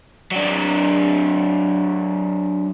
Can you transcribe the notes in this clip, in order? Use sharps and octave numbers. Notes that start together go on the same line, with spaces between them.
F#3 D4